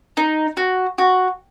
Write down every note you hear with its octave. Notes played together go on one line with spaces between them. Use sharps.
D#4
F#4
F#4